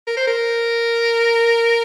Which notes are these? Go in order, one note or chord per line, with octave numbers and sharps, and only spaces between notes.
A#4
C5
A#4